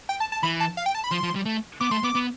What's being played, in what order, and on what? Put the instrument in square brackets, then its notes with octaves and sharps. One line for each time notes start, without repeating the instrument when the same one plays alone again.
[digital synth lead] G5
A5
A5
[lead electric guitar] E3 [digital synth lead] B5
[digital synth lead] A5
F5
G5
A5
B5
[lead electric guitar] F3 [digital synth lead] C6
[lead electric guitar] F3
G3
A3
[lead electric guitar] B3 [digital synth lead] D6
[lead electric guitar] A3 [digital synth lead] C6
[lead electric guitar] B3 [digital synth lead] D6
[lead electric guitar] B3